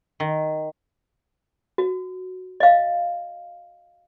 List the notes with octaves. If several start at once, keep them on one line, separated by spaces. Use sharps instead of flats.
D#3
F#4
D#5 F5